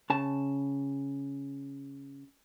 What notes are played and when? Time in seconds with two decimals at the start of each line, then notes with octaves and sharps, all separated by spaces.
0.10 C#3 A5